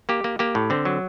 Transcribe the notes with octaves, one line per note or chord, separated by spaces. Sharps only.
A#3 G4
A#3
A#3 G4
A2
D3 C4
F#3